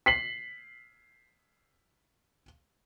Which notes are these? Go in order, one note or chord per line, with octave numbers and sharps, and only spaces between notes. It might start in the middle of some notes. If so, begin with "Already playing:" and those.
B6 C7 F#7